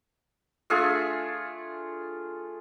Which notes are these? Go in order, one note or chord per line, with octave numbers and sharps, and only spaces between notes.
A3 D4 F4 G#4